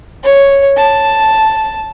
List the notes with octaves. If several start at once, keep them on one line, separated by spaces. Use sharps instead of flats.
C#5
A5